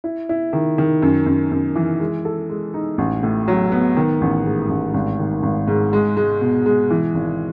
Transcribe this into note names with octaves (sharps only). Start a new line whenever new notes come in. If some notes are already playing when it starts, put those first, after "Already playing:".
E4
E4
D#3
D#3
F#2
F#2
F#2
E3
G#3
A4
G#3
D#4
A1
A2
F#3
B3
D#3
A1
G#2
A1
G#1
D#3
G#1
G#2
G#3
G#3
B2
G#3
E3
G#1